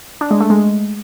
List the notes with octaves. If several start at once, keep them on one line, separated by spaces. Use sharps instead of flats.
D4
G#3
A3
G#3